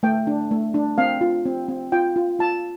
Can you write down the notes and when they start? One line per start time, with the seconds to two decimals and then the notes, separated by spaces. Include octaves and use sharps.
0.03 A3 G5
0.27 D4
0.51 A3
0.74 D4
0.98 C4 F5
1.21 F4
1.46 C4
1.69 C4
1.92 F4 G5
2.16 F4
2.39 F4 A5